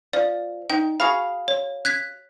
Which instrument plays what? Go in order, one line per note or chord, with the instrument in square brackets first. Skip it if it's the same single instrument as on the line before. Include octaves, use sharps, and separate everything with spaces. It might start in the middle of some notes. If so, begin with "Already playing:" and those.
[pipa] F3 [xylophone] D5
[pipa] D#4 [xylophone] G5
[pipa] F#4 G#4 F5 [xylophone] B5
[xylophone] C#5
F#6 G#6 B6